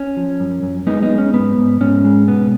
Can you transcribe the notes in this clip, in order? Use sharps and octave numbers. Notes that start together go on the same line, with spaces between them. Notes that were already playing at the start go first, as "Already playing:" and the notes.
Already playing: C#4
F3
F#2
F#2
G#3 B3 D#4
B3 D#4
G#3
C#4
G#2 B3
G#2
G#2 C#4
G#3
B2 B3